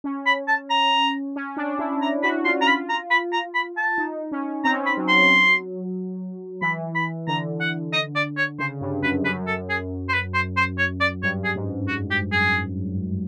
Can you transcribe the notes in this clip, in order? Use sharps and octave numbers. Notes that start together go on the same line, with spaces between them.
C#4
B5
A5
A#5
C#4
D4
E4
A#5
F#4 B5
F4 C6
A#5
F4 B5
A#5
B5
A#5
B5
A5
D#4
C#4
C4 A#5
C#4
C4 B5
F#3
C6
E3 B5
B5
D3 A#5
F#5
D#5
D5
C#5
C#3 C5
G2
F#2 B4
F#2 B4
A4
G#4
C5
B4
C5
C5
C#5
D5
G2 C#5
G#4
G#2
F#4
G4
G#4